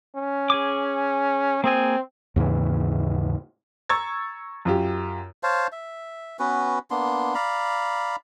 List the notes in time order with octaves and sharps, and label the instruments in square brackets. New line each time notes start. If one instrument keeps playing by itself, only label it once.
[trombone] C#4
[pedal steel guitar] G#4 G#5 D6
[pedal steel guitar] A#3 G#4 G#5 [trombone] C4
[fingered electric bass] D#2 G#2 C#3 E3
[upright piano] A#5 C#6 E6 G#6 A6
F#2 F4 G4
[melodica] C5 C#5 F5 A5
E5
B3 C#4 F#4 B4
A#3 B3 D4 C6
D5 F5 A#5 B5